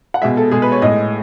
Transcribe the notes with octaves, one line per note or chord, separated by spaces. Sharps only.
F#5
B2 G#3 E5
A4
B2 G#3 G#4
B4
C#5
A2 G#3 D#5